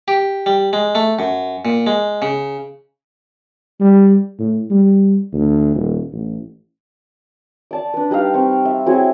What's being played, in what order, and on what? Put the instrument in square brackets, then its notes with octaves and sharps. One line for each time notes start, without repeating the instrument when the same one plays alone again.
[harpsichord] G4
G3
G#3
A3
F#2
A#2
G#3
C#3
[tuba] G3
A2
G3
D2
D#1
A1
[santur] D5 A5 D6
D4 B4
G3 D#4 B4 F5
C4 C#6
E5
F#3 C4 E4 G#4